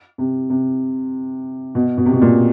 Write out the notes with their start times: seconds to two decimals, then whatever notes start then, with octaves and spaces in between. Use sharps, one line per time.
0.18 C3
0.50 C3
1.75 B2
1.98 B2
2.06 C3
2.13 B2
2.22 A#2